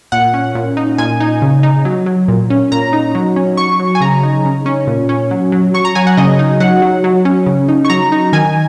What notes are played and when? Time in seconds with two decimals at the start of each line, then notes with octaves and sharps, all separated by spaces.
0.12 A#2 F#5
0.34 C#4
0.55 A#2
0.77 D#4
0.98 A#2 G#5
1.20 D#4
1.42 C#3
1.63 D#4
1.85 F#3
2.06 F#3
2.28 A#2
2.50 C#4
2.72 A#2 A#5
2.93 D#4
3.15 F#3
3.36 C#4
3.57 F#3 C#6
3.80 F#3
3.95 G#5
4.01 C#3 A#5
4.23 D#4
4.45 C#3
4.66 C#4
4.87 A#2
5.09 C#4
5.31 F#3
5.52 F#3
5.74 F#3 C#6
5.85 A#5
5.95 F#3 G#5
6.07 F#5
6.17 C#3 D#5
6.39 D#4
6.60 F#3 F#5
6.82 F#3
7.04 F#3
7.25 C#4
7.46 C#3
7.68 D#4
7.85 C#6
7.90 F#3 A#5
8.12 D#4
8.33 D#3 G#5